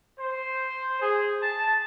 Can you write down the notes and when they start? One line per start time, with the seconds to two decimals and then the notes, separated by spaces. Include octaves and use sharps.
0.19 C5
1.02 G#4
1.42 A5